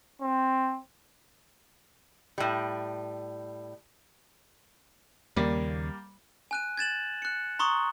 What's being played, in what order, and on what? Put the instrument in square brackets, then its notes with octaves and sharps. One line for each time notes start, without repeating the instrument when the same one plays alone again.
[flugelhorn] C4
[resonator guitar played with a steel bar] A2 G3
[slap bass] D#2 C#3 [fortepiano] G3 A#3
[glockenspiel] G#5 F#6 D#7
G#6 A6 E7 F#7
F#6 C#7
A#5 C6 C#6 D#6